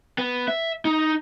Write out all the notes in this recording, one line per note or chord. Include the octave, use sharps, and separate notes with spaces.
B3
E5
D#4